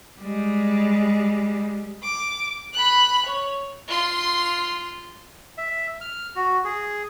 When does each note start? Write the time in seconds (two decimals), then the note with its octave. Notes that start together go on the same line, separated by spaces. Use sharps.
0.20 G3 G#3
2.03 D6
2.73 B5 F#6
3.26 C#5
3.88 F4 C6
5.58 E5
6.01 F6
6.36 F#4
6.65 G#4